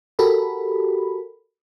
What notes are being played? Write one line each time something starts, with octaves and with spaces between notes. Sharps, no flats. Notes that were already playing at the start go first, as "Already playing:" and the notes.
F#4 G4 A4 A#4 B5